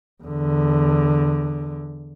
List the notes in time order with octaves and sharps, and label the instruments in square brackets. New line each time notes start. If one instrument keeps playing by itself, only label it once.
[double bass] E2 D3